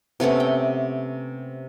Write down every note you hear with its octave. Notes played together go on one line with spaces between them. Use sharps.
C3 A3 B3 C#4
G5